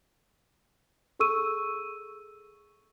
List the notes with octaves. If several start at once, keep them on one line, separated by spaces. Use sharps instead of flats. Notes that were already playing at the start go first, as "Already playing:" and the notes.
G#4 A4 C#6 E6 D#7